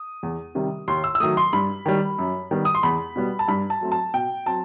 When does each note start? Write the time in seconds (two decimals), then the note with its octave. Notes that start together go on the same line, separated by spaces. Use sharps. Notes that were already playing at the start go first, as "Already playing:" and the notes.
Already playing: D#6
0.23 E2
0.55 C3 D#3 G3
0.88 D#2 C6
1.04 E6
1.15 E6
1.20 D#3 F#3 A3 D#6
1.37 C6
1.53 G2 B5
1.86 D#3 G3
2.19 F#2
2.51 D#3 G3 B3
2.65 D#6
2.75 C6
2.83 E2 B5
3.16 B2 G3 B3
3.39 A5
3.48 G2 B5
3.70 A5
3.81 F#3 A3 C4
3.92 A5
4.14 B2 G5
4.46 F#3 C4 A5